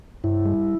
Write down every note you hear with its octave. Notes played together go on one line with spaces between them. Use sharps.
G2 E4
G3